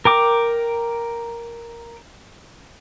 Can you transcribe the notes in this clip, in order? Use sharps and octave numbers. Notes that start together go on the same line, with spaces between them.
A#4 G5 D6